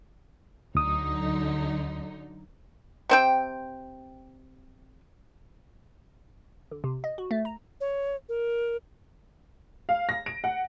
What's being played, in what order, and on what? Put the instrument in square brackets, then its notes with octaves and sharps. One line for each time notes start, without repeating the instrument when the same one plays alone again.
[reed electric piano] D2 D#6 [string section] D3 F#3 D#4
[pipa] C3 C4 G5
[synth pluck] D3
C3
D#5
F#4
A3
A#5
[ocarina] C#5
A#4
[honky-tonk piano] F5
A#6
D7
F#5